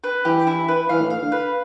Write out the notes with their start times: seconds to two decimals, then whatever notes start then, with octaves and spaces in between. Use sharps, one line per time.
0.04 B4
0.25 E3 G4
0.47 E4
0.68 B4
0.89 E3 F5
1.01 A2
1.10 F5
1.22 D3
1.32 B4